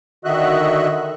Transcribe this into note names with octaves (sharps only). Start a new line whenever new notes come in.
D3 D#3 F#4 D#5 E5 F#6